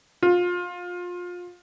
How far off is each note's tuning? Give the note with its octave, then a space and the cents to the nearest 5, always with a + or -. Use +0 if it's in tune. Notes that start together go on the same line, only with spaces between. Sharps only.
F4 +25